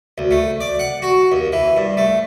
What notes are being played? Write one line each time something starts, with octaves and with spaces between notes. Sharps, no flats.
D2
A3
D5
F#5
F#4
D#2
E3
G2
A3